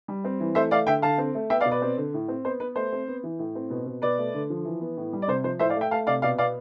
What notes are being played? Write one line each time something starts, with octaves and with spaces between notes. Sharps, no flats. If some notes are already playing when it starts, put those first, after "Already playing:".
G3
C4
E3
A3 C5 E5
A3 D5 F5
D3 E5 G5
D3 F5 A5
C4
A3
B3 E5 G5
D5 F5
B2
B4 D5
C4
D3
A2
C4
B3 C5
B3 B4
A3 C5
C4
B3
E3
A2
C4
B2
B2
B2 B4 D5
A3
D3
F3
E3
B3
A2
G3
D5
C3 C5
F3 C5
A2 C5 E5
D5 F5
A3
E5 G5
A3 F5 A5
C3 D5 F5
B2 D5 F5
B3 D5 F5